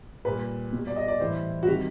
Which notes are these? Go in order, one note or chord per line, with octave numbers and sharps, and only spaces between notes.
A#2 G3 B4
B2 G3
D5
D#5
D5
A2 E3 G3 C5
F#4
C3 D#3 G3 G4